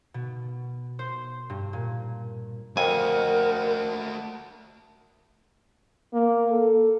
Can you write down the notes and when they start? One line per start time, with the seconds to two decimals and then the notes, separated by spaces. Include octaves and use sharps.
0.14 B2
0.99 C5
1.50 G2
1.73 A#2
2.77 F2 A3 F#4 A#4 G#5
6.13 A#3
6.50 A4